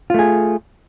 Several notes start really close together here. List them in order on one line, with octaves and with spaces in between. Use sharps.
F4 A3 G#4